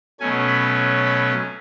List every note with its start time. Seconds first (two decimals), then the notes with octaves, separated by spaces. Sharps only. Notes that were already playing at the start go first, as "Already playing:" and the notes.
0.20 B2 F#3 A3 C#4 G#5
0.48 B5
1.05 B5